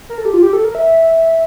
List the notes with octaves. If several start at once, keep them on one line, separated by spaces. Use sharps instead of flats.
A#4
A4
G4
F4
G4
A4
A#4
E5